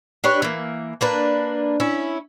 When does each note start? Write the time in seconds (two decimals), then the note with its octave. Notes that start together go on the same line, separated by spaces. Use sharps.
0.24 D4 G4 B4 C#5
0.42 E3 A#3
1.01 A#3 D4 B4
1.80 C#4 E4